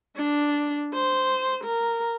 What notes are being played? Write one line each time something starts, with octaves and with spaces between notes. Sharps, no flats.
D4
C5
A#4